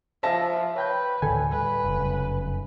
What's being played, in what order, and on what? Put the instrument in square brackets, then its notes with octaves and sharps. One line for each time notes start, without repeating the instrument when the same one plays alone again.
[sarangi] F3 [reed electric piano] C5 [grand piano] E5 A5 A#6
[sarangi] B4 [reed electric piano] C#5 G5 G6
[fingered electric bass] D2 A2 D3 [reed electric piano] A4 G#5
[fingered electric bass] G3 [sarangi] B4
[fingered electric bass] F1 F#2 C#3